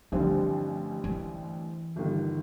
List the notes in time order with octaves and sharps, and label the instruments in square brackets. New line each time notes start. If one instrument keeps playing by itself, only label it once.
[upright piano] A1 G2 D3 G3 C4 [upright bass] F3
[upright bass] E3
[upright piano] G1 G2 D#3